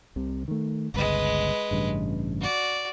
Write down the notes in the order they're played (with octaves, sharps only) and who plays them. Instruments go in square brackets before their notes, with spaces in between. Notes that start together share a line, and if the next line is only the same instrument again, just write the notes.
[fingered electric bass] C2 C3
D#3 A3
[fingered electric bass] G1 C#2 [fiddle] G#3 B4
[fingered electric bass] A1 G2 C#3
[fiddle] F#4 D5